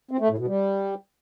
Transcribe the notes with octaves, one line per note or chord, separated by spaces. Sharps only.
C4
A3
A2
B2
G3